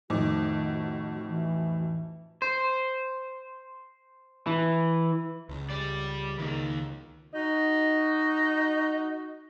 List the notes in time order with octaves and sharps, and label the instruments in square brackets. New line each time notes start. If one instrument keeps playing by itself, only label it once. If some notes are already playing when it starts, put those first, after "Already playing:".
[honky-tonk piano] F2 [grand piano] A2 D#4 D6 [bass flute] D#3 [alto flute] F#4
[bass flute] E3
[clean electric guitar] C5
E3
[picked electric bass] C#2
[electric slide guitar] G3 D5
[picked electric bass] C#2 [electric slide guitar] D#3 A#3
[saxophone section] D#4 F#4 D#5